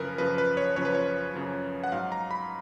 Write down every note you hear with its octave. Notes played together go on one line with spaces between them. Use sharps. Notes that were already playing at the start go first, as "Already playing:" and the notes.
Already playing: F#2 C#3 F3 A#4 B4
F#2 C#3 F3 B4
B4
C#5
F#2 C#3 F3 C#5
B4
C#5
F#2 C#3 F3
F#5
G#2 F#3 F5
A#5
B5